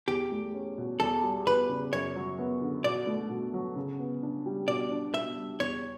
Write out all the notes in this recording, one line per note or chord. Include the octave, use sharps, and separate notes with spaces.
E2 G4
A3
C#4
B2
E2 A4
G3
E2 B4
C#3
F#2 C#5
F#3
B3
D3
B2 D5
A3
B2
F#3
C#3
B3
D4
G3
B2 D5
D4
B2 E5
G3
E2 C#5